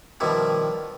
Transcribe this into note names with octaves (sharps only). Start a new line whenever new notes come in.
B2 D#3 F3 G3 E4